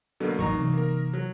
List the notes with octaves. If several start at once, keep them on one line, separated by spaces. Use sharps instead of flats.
B2 D3 F#3 A#3
A1 D2 G3 D#4 A#5 C#6
C3 E3 C4
A#3 A#4
F#3